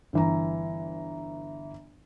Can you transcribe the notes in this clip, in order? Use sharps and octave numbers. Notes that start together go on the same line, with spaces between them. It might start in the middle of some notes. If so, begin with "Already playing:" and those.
G1 E3 A#5